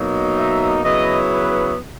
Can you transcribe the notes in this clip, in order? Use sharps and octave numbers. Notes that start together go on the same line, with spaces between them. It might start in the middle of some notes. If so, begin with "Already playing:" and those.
Already playing: B2 F#3 A#3 D#4
E5
C#3 F#3 B3 E4 D#5
B4